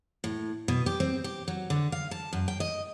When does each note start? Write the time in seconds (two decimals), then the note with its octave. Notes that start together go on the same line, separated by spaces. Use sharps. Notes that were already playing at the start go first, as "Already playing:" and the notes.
0.24 A2
0.68 B2
0.86 G4
1.00 C4
1.24 G4
1.48 F#3
1.70 D3
1.92 F5
2.11 A5
2.33 F#2
2.48 G5
2.60 D#5